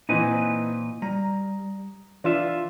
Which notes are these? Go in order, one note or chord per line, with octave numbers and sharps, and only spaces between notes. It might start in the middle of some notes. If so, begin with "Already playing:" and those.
A#2 E3 C4 D#4 B4 G#5
G3 A#5
E3 D4 F4 E5